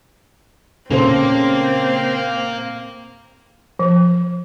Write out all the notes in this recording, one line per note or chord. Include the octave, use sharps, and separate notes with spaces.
A#2 C#3 A#3 C4 C#4 A4 C5
F3